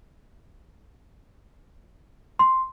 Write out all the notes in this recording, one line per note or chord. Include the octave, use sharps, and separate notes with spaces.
C6